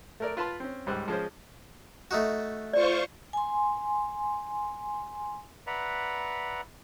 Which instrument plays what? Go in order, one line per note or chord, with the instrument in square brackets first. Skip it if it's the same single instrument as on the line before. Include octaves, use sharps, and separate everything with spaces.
[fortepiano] A3 A#4 D5
F4 B4 A5 C6
C4 C#4
C#2 G#2 G3 C5 E6 F#6
F3 G#3 C#4 C5
[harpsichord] A3 D#4 F#4
[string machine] F4 C5 C#6 [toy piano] D5
[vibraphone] G#5 C6
[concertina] B4 D5 E5 F#5 A#5